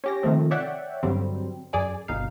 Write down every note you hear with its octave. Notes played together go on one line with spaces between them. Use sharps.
C#4 G4 A#6
C3 D#3 F3 A3 C4
C#5 D5 E5 F#5 G5
G2 D3 F#3 G3 C4
F#2 G#4 D5 G#5
G1 B2 D#4 F5